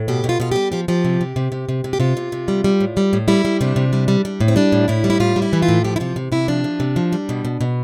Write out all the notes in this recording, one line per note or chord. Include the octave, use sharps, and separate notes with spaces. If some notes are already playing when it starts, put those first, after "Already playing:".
Already playing: A2
B2 G4
B2
F4
B2 F4
G3 G4
F3 G4
F3 G4
C3
C3
C3
C3
C3
C3
G4
C3 F4
C3
C3
G3
G3
A2
G3
A2
G3 E4
G3
C3 D4
C3
G3
G3
G3
A2
C4
G3 D4
A2
A2 E4
G3
E4
A2 F4
G3
E4
E3
F4
A2
F3 G4
E4
C3 F4
C3
C3 E4
F3 D4
F3
C3
F3
G3
B2
B2
B2